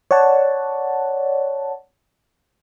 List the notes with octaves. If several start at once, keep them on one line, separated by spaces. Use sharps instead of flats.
C#5 D5 F#5 A5